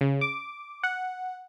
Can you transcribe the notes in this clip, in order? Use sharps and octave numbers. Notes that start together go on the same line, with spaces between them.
C#3
D6
F#5